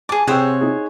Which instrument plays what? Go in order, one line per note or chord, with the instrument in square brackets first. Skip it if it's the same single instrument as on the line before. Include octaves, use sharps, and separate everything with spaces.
[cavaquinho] G#4 A5 [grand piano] D6
[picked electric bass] C3 [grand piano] G#4 G5 E6 [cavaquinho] C5 C#5 F#5
[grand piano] D#4 G#4